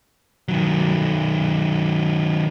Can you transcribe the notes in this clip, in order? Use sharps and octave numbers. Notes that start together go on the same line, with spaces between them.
D#3 F#3